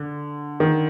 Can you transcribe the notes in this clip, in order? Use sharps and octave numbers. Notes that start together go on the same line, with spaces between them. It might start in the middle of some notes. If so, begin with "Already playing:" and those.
Already playing: D3
D#3